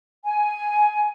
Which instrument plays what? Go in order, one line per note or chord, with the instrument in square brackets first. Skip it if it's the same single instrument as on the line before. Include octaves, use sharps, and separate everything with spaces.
[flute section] G#5